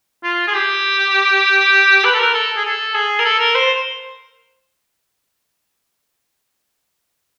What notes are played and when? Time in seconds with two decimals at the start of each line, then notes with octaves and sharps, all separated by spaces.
0.24 F4
0.47 G#4
0.54 G4
2.05 B4
2.14 A4
2.19 A#4
2.34 A4
2.57 G#4
2.65 A4
2.94 G#4
3.19 A#4
3.24 A4
3.40 A#4
3.55 C5